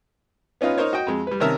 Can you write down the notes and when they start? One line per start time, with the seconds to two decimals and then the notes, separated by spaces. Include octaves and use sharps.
0.61 B3 C#4 D#4 F4 B4
0.78 D#4 A#4 C5 C#5
0.93 F#4 D#5 G5
1.07 F2 G#3
1.27 G3 B4
1.40 C3 D#3 C#4 A#4 E5 A5